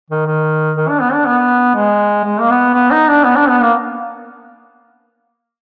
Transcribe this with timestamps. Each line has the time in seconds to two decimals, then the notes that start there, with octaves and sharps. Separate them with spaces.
0.10 D#3
0.26 D#3
0.76 D#3
0.89 D4
1.01 B3
1.14 D4
1.26 B3
1.75 G#3
2.25 G#3
2.40 A#3
2.50 B3
2.74 B3
2.91 D#4
3.08 D4
3.24 B3
3.36 D4
3.49 B3
3.61 A#3